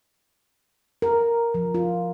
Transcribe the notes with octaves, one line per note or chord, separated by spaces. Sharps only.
A#4
F3
F4